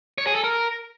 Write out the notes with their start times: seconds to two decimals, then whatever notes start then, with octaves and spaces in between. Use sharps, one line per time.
0.18 C#5
0.27 G#4
0.35 A4
0.44 A#4